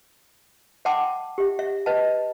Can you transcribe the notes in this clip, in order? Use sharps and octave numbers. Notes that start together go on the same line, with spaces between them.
E5 F#5 G5 A5 C6 D6
G4 E5
E5
B4 D#5 E5 A5